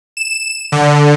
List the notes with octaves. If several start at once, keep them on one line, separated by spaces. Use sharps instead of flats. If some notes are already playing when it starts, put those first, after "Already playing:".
E7
D3